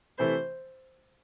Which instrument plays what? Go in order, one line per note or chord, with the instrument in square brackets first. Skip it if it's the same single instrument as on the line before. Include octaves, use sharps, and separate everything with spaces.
[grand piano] C3 E3 A3 E4 [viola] C5